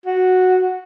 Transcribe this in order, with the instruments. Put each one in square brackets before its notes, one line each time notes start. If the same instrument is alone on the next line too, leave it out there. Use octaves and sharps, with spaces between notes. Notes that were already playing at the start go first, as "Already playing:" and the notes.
[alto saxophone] F#4